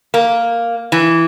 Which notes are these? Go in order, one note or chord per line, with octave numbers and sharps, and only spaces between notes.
A#3
E3